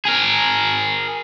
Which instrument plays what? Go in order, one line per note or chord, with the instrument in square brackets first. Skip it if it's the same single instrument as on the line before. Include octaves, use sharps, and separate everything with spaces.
[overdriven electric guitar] G#4 A#4